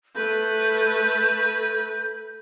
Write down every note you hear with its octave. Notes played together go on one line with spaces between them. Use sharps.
A3 B4 G6